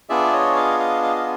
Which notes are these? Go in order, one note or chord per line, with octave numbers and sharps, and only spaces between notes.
B3 D4 F4 G#4 D5 E5
C#5 D#5
D#5 F5
D#5 F5
D#5 F5
F5